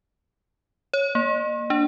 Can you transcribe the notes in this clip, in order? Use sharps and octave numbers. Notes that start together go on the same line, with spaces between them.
C#5
A#3
D4